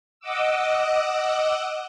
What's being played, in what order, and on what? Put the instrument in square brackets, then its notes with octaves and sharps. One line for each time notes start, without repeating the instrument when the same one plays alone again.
[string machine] D#5 F#5 D6 E6